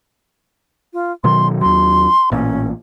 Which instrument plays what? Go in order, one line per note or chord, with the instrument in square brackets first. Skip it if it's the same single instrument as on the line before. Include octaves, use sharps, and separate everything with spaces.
[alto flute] F4
[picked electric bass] B2 D#3 F#3 [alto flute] C6
[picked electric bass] D#2 F#3 [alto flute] C6
[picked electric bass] A1 A#2 [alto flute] C#4